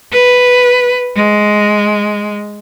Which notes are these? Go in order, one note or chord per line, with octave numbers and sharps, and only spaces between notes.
B4
G#3